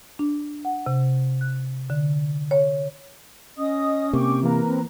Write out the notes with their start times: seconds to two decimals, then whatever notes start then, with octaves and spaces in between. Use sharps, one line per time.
0.19 D4
0.65 F#5
0.86 C3
1.41 F#6
1.90 D3
2.51 C#5
3.57 C#4 D#5 D#6
4.13 C3 A#3 G5 C#6 D6
4.43 E3 A#3 A#4 B4 A#5
4.67 C4